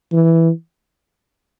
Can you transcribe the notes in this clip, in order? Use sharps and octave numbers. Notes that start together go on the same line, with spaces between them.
E3